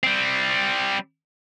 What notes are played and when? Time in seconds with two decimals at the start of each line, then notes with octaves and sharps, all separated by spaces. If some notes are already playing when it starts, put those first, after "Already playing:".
0.03 G3 C4